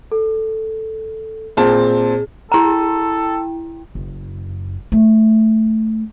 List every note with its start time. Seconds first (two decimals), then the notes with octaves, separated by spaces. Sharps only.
0.12 A4
1.57 A#2 C4 G#4 A5
2.52 E4 A4 G5 A#5
3.95 F#1
4.92 A3